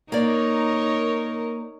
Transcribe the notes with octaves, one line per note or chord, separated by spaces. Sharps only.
A#3 D#4 A#4 C#5 D5